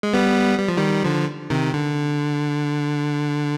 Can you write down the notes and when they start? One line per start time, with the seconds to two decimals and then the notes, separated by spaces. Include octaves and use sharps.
0.03 G#3
0.14 G3 B3
0.59 G3
0.68 F3
0.77 D#3 G3
1.04 D3 F3
1.50 C3 D#3
1.74 D3